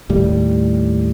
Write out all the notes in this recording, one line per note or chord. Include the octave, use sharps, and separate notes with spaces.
D#2 A2 G3